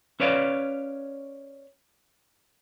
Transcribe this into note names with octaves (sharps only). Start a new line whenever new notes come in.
C#4 B4 C#5 D5 F5